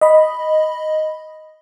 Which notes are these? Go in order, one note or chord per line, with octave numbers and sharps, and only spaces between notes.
D#5 B5